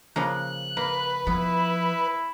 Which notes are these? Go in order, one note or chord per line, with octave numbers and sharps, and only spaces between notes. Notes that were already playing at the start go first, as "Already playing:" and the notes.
C#3 F3 A#3 F#6
A#3 B4
F3 B3 E4